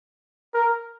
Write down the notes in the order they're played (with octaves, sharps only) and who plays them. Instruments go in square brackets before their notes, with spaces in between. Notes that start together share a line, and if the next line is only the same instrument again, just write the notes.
[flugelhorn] A#4